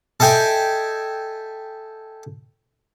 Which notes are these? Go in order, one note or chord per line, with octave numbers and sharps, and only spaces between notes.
A4 D#5 E5 G5 G#5